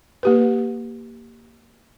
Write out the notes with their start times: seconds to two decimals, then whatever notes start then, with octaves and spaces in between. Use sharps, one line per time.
0.23 A#3 G4 B4